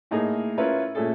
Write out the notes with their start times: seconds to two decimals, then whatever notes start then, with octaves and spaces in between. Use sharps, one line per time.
0.11 A2 A#3 D#4 G#4
0.58 C#4 E4 F4 A#4 B4
0.95 A#2 A3 C#4 G#4 A4